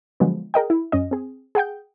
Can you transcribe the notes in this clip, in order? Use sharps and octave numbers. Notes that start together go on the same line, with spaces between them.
D3 F3 F#3 G#3 B3
G#4 A#4 D#5 G5
E4
F#2 C#4 D#5
C4 G#4
G#4 F#5 G5 G6